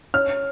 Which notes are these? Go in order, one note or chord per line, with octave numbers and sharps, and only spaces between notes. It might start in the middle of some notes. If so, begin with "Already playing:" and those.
C#4 F6